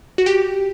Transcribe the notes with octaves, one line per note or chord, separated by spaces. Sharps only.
F#4
G4